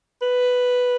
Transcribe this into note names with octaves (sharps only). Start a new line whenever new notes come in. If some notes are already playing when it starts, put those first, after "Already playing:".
B4